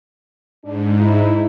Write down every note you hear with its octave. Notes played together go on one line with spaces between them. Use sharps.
G#2 D4
D#4 E4